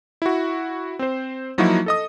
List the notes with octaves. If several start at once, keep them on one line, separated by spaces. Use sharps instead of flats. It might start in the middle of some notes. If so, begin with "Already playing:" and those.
E4 F#4
C4 C5
F3 F#3 A#3 D#4 E4 F#4
A4 D#5 D#6